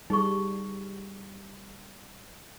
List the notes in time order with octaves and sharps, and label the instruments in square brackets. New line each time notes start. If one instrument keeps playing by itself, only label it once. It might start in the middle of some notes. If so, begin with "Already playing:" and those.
[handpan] G3 [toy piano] D#4 G#4 C#6